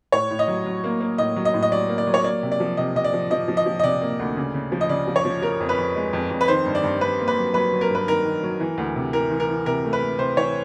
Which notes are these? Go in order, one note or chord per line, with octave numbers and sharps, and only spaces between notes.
A2 C#5
A2
D#5
F#3
F#3
A#3
A#3
A2 D#5
F#3
D#5
A2
D#5
F#3 D5
A#3
D5
F#3
C#5
A#3 D5
C3
D5
F3
C3 D#5
C3 D#5
D5
F3
F3 D#5
F3
D#5
F3
D#5
C3 D5
A#3
D2
C#3
C#3
F3
D#5
C#3 D5
F3
C#5
F3
F3 A#4
F2
B4
F2
G#3
F2
F2
B4
D#3 C5
G2
D5
G2
G2 B4
A#3
B4
F#3
F#3 B4
F#3
A#4
G2 B4
D#3 A#4
D#3
F#3
E3
D2
C3
E3 A#4
E3
A#4
E3
C3 A#4
A3
B4
A3
C3 C5
E3 C#5